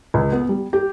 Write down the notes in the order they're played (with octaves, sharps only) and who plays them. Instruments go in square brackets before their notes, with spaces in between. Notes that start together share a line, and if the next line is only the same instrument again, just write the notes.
[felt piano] C#2
B3
G3
G4